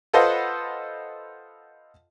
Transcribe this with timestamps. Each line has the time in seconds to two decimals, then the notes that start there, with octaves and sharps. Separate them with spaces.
0.13 F4 A4 B4 C5 D#5 F#5